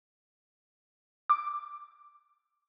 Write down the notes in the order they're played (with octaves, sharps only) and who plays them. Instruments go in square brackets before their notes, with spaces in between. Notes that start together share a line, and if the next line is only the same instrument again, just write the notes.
[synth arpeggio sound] D6